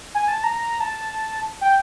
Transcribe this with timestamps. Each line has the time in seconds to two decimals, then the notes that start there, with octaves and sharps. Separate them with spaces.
0.15 G#5
0.28 A5
0.44 A#5
0.58 A#5
0.80 A5
1.61 G5